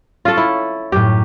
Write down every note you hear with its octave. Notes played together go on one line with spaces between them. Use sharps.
C#4 F4 A4
E4
F#2 A2 G4